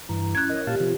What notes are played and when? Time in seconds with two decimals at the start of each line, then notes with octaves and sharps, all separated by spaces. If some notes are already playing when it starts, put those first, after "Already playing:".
0.09 G2 E3 A#5
0.35 C#4 E4 F#6 G#6
0.50 A#4 C#5 D#5
0.67 A#2 G4 F5 A5
0.80 C3 F3